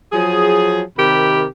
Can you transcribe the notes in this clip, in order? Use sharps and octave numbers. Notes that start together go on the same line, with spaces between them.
F3 F#3 G#4
C3 D#3 G4 A#4 B5